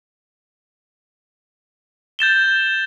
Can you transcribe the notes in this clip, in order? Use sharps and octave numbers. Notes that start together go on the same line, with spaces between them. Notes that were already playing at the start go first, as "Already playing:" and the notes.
G6 A6 E7 G7